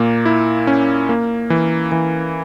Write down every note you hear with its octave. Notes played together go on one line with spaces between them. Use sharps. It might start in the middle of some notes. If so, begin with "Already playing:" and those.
Already playing: A#2 A#3
E4
C#4
A#3
E3
E3